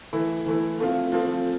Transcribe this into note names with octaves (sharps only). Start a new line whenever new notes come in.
E3 A3 E4
E3 A3 E4
F3 A3 C4 F4
F3 A3 C4 F4